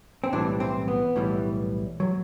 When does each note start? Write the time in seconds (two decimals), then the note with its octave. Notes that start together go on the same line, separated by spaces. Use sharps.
0.24 C4
0.32 B1 A2 E3 G3 D4
0.60 C4
0.88 B3
1.15 B1 A2 E3 G3
2.00 F#3